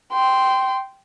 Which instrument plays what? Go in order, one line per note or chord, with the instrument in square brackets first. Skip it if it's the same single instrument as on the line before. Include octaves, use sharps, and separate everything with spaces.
[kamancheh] G5 C6